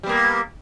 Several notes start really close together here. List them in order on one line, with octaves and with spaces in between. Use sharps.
G3 B3 A#3